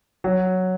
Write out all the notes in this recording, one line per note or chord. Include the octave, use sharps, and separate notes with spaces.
F#3